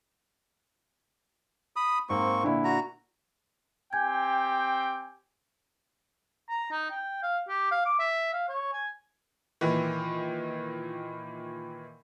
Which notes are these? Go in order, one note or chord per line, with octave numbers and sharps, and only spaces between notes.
B5 D#6
G#2 A#3 C4 C#6
A#2 D3 E4
F#4 A#5
C4 G4 G5 G#5 G6 G#6
A#5
D#4
G5
F5
G4
F5
D6
E5
F5
C#5
G#5
A#2 D#3 E3